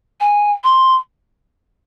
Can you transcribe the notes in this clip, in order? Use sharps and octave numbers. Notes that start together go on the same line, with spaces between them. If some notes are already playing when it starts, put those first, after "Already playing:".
G#5
C6